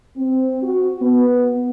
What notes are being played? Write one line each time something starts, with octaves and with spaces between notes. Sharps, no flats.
C4
F#4
B3